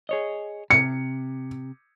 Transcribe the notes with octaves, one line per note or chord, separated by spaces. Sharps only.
G#4 C#5 D#5
C3 C#7